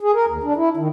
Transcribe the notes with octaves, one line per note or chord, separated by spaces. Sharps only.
G#4
A#4
D#2
D4
E4
D#3